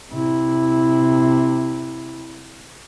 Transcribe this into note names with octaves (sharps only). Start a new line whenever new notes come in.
C3 E4